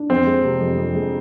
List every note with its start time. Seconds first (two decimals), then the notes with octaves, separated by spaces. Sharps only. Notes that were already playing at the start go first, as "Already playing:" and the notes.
Already playing: D4
0.10 F2 C4
0.26 G#3
0.44 C3
0.60 F2
0.77 F2
0.95 G#3